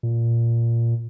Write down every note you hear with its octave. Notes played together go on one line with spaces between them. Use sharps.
A#2